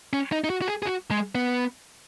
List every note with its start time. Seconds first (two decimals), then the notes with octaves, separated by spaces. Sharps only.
0.13 C#4
0.32 D#4
0.44 D#4
0.50 F#4
0.62 F#4
0.68 G#4
0.83 G#4
0.86 F#4
1.11 G#3
1.35 B3